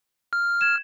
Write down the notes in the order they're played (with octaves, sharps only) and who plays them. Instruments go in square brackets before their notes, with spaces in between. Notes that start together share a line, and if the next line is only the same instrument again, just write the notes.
[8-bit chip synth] F6
[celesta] G#6 E7